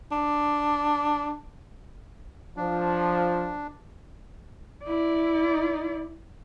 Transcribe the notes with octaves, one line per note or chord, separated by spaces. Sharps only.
D4
F3 D4
E4 D5